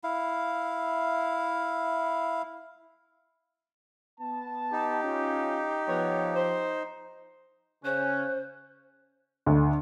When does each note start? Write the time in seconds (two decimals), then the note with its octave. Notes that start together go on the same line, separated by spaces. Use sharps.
0.04 E4 F5
4.20 B3 A5
4.72 D#4 G4
5.04 C#4 F4
5.88 F3 B3 C#5
6.36 C5
7.84 C#3 C#4 C5 F#6
9.46 D2